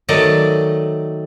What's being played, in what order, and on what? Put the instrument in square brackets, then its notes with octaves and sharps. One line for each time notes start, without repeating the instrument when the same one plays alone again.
[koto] D#3 F#3 A3 D5 D#5